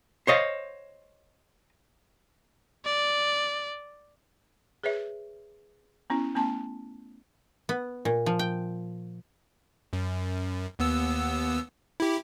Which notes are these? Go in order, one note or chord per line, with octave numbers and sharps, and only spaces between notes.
C5 C#5 D#5 F5
D5
G#4 B4 C#5 E5
B3 C#4 E4
A3 B3 C#4 A5 C6
B3
A#2
F3
G5
F#2
D#2 B3 E6
E4 G4